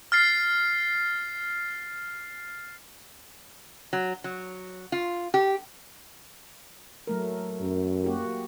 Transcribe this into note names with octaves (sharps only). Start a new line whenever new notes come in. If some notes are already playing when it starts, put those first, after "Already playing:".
F6 A6 C7
F#3
F#3
F4
G4
F#3 A3 A#4
F#2
A#3 F#4 G4